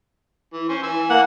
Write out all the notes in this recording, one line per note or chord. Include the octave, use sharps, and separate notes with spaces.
E3
C#4 C5
E3 G#5 E6
A#3 F#5